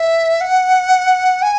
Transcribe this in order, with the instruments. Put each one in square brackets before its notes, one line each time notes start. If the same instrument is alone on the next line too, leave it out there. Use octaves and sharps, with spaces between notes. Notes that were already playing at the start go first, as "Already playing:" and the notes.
Already playing: [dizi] E5
F#5
G#5